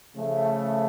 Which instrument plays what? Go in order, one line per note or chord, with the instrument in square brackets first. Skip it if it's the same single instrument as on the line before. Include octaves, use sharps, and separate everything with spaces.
[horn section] C#3 F3 A3